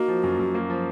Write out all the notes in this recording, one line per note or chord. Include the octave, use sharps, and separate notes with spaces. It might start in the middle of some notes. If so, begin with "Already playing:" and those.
Already playing: A#3 D#4 F#4
F3
F#2
F#2
A#3
F3